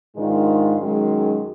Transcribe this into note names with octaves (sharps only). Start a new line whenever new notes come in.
G#2 D#3 G#3 D4 F4
F#2 D#3 G#3